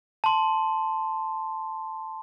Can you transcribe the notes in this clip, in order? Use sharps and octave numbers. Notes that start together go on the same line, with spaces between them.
A5 C6